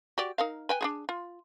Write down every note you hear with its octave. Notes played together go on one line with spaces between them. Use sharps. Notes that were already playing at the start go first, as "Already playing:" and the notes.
F#4 G4 D5
D#4 A#4 F5
B4 G5 G#5
D4 F4 G#4
F4